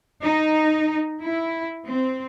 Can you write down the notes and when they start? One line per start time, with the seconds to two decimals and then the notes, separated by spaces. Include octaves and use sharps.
0.23 D#4
1.21 E4
1.89 C4